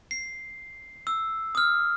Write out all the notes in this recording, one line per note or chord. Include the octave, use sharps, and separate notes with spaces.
C7
E6
D#6 F6